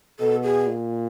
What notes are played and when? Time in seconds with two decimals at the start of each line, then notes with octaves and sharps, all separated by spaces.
0.19 B2 A4
0.43 G#4
0.66 A#2